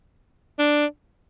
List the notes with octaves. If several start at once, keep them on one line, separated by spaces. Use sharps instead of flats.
D4